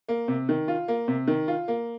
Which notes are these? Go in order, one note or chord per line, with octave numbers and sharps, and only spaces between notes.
A#3
C3
D#3
F4
A#3
C3
D#3
F4
A#3